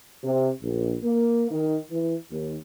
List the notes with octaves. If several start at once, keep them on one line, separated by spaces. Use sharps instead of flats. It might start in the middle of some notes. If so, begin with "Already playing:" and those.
C3
A#1
A#3
D#3
E3
D#2